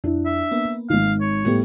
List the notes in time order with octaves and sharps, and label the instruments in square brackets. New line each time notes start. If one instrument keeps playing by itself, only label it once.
[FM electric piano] F2 E4 [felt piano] D4
[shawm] E5
[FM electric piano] A#3 B3
[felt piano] G#1 D#3 [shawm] F5
[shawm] C#5
[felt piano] A2 [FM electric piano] G3 B3 G4